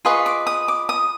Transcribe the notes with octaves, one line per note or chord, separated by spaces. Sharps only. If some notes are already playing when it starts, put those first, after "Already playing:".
F4 G#4 B4 D#5 C#6
D6
D#6
D6
D#6